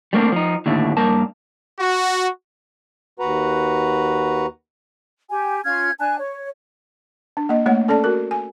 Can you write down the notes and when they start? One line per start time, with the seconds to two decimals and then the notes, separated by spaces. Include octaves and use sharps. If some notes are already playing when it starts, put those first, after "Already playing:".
0.13 G3 A3 A#3 C4 D4
0.32 F3 D#4
0.66 D#2 A2 D3 A3
0.97 G2 A#3 A#4 A5
1.80 F#4
3.19 D#2 F#4 B4 F#5 A#5
5.29 G4 G#5
5.64 C#4 F4 F6 G#6
5.99 D4 G#5 A5 F#6
6.18 C#5
7.37 D4
7.49 A#3 D#5
7.66 A3 A#3 C#5 F#5
7.88 C#4 A4 D5 A5
8.04 F#4 A#4
8.31 G#5